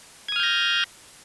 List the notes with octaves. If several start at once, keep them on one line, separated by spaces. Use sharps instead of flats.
D#6 F6 G6 G#6 A#6